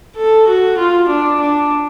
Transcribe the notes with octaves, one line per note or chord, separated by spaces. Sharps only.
A4
F#4
F4
D4
D4